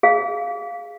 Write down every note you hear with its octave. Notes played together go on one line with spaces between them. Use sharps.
G#4 F5